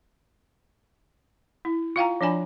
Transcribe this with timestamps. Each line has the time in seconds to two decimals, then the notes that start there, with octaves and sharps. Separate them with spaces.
1.65 E4
1.96 F4 F5 G5 A#5
2.21 F3 D4 D5 G#5 B5